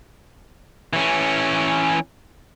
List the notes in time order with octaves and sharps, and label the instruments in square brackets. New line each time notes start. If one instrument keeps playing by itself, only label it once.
[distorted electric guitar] E3 C#4